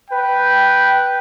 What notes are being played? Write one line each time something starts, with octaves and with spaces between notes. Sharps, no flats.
B4 G5